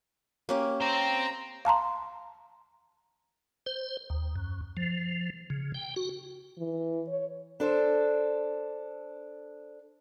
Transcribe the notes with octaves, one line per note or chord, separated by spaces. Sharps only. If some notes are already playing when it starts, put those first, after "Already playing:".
A#3 C#4 G4
C5 G5 A#5
F5 A5 A#5 C6
C5
D#2
F#2
F3
C#3
G5
F#4
E3
C#5
D4 A4 C5